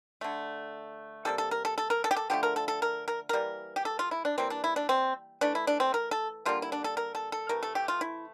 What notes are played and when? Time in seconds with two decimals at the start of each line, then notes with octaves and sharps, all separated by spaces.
0.21 D3 A3
1.25 C3 G3 A#3 A4
1.38 A4
1.51 A#4
1.65 A4
1.78 A4
1.90 A#4
2.04 A4
2.11 G4
2.16 A4
2.30 D3 F3 A3 G4
2.43 A#4
2.56 A4
2.68 A4
2.82 A#4
3.08 A#4
3.29 E3 G3 A#3 A#4
3.76 G4
3.85 A4
3.99 F4
4.11 E4
4.25 D4
4.38 E3 G3 A#3 C4
4.50 D4
4.64 E4
4.76 D4
4.89 C4
5.41 E3 A3 D4
5.55 E4
5.67 D4
5.80 C4
5.94 A#4
6.11 A4
6.45 D3 G3 A#3 F4
6.62 E4
6.72 D4
6.84 A4
6.97 A#4
7.15 A4
7.32 A4
7.49 C3 E3 A3 A#4
7.63 A4
7.75 G4
7.88 F4
8.01 E4